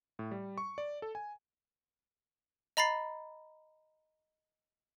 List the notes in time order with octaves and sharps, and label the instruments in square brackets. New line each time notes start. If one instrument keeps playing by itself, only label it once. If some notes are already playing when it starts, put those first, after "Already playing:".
[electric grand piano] A2
G3
C#6
D5
A4
G#5
[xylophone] D#5 A#5 B5 A6 C7